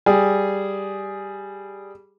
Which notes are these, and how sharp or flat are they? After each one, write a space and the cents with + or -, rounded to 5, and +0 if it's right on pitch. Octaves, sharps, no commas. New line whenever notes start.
G3 +0 G#4 +0